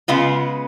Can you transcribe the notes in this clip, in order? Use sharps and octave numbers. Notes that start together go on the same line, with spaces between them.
C#3 G#3 B3 F4